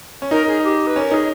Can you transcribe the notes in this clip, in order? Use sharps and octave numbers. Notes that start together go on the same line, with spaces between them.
C#4
D#4 A#4
G#4
G4
B4
C#4 A#4
D#4 G#4